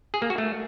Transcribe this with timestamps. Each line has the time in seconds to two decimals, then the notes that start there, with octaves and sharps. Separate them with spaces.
0.14 G#4
0.22 A#3
0.30 F#4
0.38 A3